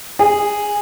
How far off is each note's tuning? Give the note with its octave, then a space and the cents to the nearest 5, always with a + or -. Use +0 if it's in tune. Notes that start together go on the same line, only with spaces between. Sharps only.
G#4 -10